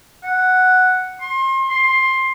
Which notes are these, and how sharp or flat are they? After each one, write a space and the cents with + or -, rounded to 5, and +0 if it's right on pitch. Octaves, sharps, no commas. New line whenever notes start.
F#5 +0
C6 +35
C6 +15